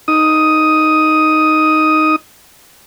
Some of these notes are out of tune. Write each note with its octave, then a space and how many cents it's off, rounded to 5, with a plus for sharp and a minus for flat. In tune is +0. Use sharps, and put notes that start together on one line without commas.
D#4 +0 D#6 +5